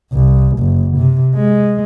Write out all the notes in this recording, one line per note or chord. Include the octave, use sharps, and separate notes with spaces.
C2
F#1
C3
G#3